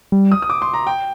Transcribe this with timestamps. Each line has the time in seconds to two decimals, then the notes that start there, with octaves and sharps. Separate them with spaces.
0.12 G3
0.32 D#6
0.42 D#6
0.50 D6
0.62 C6
0.74 A#5
0.87 G5